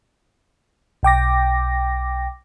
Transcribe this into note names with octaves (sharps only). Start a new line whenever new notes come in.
B1 G5 D6 A#6